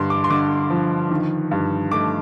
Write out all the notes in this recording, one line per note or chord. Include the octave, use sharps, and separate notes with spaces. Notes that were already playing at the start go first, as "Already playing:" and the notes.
Already playing: G2 D3 C6
D6
C6
D3 D6
F3
D#3
G2
A3 D6